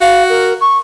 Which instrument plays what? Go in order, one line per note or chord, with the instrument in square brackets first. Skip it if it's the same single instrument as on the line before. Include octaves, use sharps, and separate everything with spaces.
[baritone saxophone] F#4 [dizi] F5
[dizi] A#4
C#6